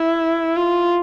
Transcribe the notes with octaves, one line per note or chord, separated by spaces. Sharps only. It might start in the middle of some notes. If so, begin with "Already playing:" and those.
Already playing: E4
F4